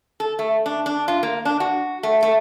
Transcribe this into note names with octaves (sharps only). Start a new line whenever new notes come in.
A4
A3
D4
D4
F4
A#3
D4
F#4
A3
A3